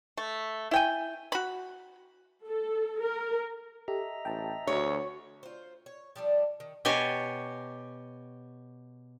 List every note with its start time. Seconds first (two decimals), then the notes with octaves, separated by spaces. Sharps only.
0.17 A3
0.71 E4 G5 G#5
1.32 F#4 B5
2.47 A4
3.00 A#4
3.88 G4 A4 D#5 E5 A#5
4.25 A1 G5 A5
4.67 D2 F#4 C#5 C#6
5.43 F4 C5
5.86 C#5
6.16 F3 G3 D4 A4
6.60 D#3
6.85 B2 G4 C#5 G#5 A5